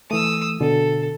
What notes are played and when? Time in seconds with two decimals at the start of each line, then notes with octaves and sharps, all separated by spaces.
0.11 E3 A3 D#6 E6
0.60 B2 D3 A4